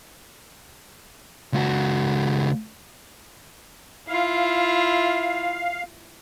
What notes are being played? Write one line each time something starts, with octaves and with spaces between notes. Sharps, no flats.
C#2 F#4
E4 F4 F5